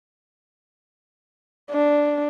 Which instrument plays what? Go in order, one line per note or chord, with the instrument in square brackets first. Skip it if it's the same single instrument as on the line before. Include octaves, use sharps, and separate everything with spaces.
[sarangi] D4